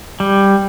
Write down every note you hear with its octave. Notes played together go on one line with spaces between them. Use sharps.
G3